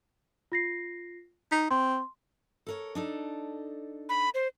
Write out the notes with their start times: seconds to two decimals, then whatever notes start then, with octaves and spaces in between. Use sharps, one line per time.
0.52 F4 A#6 C7
1.52 D#4 B6
1.71 C4 C6
2.67 A4 A#4 C#5
2.95 D4 D#4 A4
4.09 B5
4.35 C5